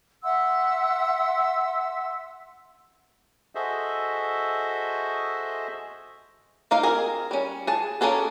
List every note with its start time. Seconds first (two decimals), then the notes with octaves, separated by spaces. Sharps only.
0.23 E5 F#5 C6 E6
3.55 F#4 G#4 A4 C5 D#5 E5
6.71 A#3 D#4 F5
6.83 C4 G#4 A#4
7.31 G3 C#4
7.67 G#4 A5
8.01 A#3 C#4 G#4 A4